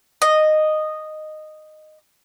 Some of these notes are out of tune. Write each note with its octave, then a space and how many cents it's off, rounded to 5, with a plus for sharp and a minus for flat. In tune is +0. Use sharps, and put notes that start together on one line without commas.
D#5 -10